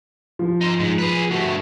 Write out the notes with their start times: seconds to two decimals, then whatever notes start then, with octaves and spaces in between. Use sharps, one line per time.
0.39 F3
0.61 D#4 C5
0.80 G#2
0.98 G#4 B4
1.31 G2 A3 F#4